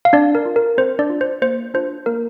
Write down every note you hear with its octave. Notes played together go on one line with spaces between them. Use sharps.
F5
C4 D4 D5
A#4
F4
A#4
C4 C5
D4 D5
F4
C5
A#3 C5
D4 F4 C5
A#3 A#4